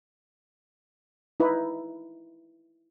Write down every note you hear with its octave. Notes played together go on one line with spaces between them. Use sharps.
D#4 E4 B4